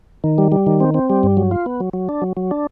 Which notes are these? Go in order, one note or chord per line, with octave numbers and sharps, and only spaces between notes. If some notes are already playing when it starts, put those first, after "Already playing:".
D#3
G3
G3
D#3
C4
C4
G3
G2
F#3
F4
B3
F#3
F#3
D4
F#3
F#3
D4